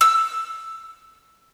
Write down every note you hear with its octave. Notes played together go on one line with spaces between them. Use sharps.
E6